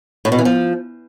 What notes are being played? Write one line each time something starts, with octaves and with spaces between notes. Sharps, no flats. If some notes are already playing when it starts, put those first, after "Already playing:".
A2
B2
E3
F3